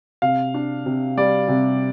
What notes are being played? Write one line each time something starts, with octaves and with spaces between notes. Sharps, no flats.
C3 F5
D4
C3
G3 D5
C3